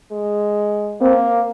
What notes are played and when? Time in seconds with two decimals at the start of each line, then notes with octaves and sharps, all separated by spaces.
0.12 G#3
1.01 A#3 C4